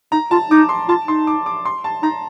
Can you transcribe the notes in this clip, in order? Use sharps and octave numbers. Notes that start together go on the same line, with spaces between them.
D#4 A#5
F4 A5
D#4 D6
C6
F4 A5
D#4 C6
D6
D6
C6
A5
D#4 A#5